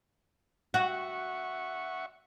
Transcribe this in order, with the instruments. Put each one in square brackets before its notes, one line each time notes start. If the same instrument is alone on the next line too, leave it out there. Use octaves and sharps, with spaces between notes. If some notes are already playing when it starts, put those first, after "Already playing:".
[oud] F#4 [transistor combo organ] E5 F#5 C#6